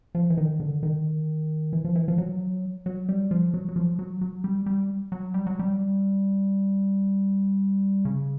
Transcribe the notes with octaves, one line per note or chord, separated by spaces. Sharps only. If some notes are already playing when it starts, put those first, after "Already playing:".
F3
E3
D#3
D3
D#3
E3
F3
E3
F3
F#3
F#3
G3
F3
F#3
F#3
F3
F#3
F#3
G3
G3
F#3
G3
F#3
G3
C#3